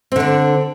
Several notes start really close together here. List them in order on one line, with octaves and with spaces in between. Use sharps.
C4 D3 D4